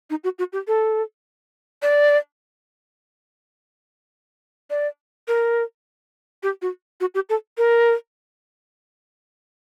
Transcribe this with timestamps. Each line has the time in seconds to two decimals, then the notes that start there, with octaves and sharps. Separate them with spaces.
0.10 D#4
0.24 F#4
0.39 F#4
0.53 G4
0.68 A4
1.82 D5
4.70 D5
5.28 A#4
6.43 G4
6.62 F#4
7.01 F#4
7.15 G4
7.29 A4
7.58 A#4